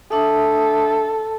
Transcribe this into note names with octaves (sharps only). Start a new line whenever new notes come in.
D4 A4 E5 D#6